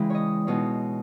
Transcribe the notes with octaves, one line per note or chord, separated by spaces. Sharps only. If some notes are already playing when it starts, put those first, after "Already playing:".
Already playing: C#3 E3 G#3 G5
C#5 D#5
B2 G#3 D#4 C#5